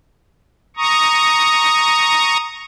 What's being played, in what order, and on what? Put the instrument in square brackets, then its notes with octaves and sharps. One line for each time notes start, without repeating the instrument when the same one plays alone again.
[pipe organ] A#5 C#6 D#6